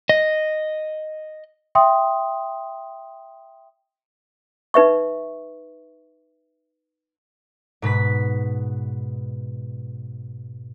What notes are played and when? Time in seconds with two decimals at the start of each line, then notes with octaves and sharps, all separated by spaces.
0.09 D#5
1.75 E5 G5 C6 D#6
4.74 D#4 B4 E5 C#6
7.82 G#2 B2 B4 B6